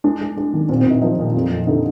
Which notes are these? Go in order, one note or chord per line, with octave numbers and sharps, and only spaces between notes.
G#3 D4
G#3
G#3
D#3
A#2 C4
C4
A#2 D#4
F3 D#4
A#2
F2
F2
D3 D#4